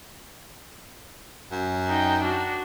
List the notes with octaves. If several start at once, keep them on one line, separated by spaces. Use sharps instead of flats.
F#2
D#4 G5
D4 F#4